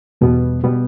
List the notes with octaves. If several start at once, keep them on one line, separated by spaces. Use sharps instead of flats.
E2 B2 G3 B3
B2 G3 B3